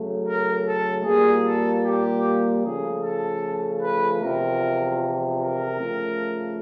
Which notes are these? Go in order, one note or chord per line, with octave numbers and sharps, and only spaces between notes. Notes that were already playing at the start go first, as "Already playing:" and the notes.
Already playing: C#3 F#3 A3
A#4
A4
A#2 G3 A#3 G#4
A4
G4
C#3 F3 A3 G#4
A4
B4
E2 C3 F3 A#4
A#4
C#3 F3 A3